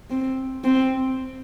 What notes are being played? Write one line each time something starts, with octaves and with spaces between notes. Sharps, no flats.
C4
C4